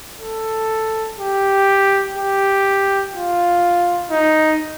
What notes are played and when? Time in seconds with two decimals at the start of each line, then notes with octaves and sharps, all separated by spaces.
0.21 A4
1.19 G4
2.16 G4
3.14 F4
4.11 D#4